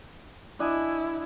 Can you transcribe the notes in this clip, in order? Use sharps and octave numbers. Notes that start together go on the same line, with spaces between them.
D4 E4 D#5 G#5